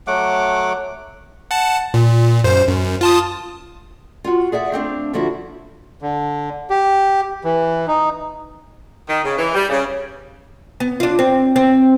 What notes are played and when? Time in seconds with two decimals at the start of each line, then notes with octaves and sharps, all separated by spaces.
0.07 F#3 A3 F#5 D6
1.51 F#5 A5
1.94 A#2
2.44 F#2 C5
2.67 F#2
3.01 F4 A5 D#6
4.24 F4 F#4
4.52 G#4 D5 E5 F#5
4.72 A3 C4 D4 F5
5.13 D3 F3 B3 E4 F#4
6.02 D3
6.70 G4
7.44 E3
7.88 D#4
9.09 D#3
9.25 C#3
9.38 E3
9.54 G3
9.70 C#3
10.80 B3
11.00 D4 F4
11.19 C4
11.56 C4